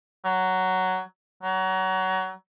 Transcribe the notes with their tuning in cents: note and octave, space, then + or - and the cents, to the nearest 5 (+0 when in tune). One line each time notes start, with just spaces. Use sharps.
F#3 +5
F#3 +25